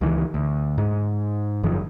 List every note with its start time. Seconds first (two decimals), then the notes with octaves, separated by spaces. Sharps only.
0.01 C#2 D#3 E3
0.34 D2
0.78 G#2
1.63 F#1 F#2 D#3 F3